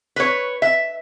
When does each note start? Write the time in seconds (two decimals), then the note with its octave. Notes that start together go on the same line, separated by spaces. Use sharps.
0.16 B4 C#5
0.62 E5